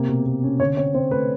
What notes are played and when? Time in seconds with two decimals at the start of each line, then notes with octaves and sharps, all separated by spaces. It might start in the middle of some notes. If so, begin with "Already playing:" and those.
Already playing: C3 A#3
0.09 B2
0.26 A#3
0.43 C#4
0.60 D3 C#5
0.77 C4 C#5
0.94 C4 C5
1.11 A3 B4